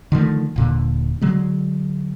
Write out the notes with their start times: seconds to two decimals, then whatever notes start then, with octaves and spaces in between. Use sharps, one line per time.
0.12 D3 D#3 F3 A3
0.56 D#1 A#2 D3
1.22 D3 F#3 G#3